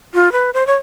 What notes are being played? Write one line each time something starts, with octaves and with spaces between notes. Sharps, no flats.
F4
B4
C5
C#5